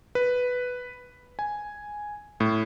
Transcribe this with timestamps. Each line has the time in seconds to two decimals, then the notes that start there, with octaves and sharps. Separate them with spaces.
0.15 B4
1.39 G#5
2.40 A2